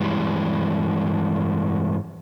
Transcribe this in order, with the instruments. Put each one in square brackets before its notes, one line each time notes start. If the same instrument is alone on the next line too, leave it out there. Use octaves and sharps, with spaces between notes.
[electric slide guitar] G2 E3 G3 G#3